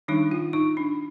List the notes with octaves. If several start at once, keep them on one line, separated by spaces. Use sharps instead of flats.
D#3 G3 D4 D#4
F4
D#4
D4